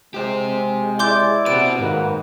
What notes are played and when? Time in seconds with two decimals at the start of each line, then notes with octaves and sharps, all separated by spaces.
0.14 G#3 G4 C5
0.99 E4 D5 C6 D6 G6
1.46 C3 F#4 B4 D7
1.79 G#2 D#3 A#3 F#4 B4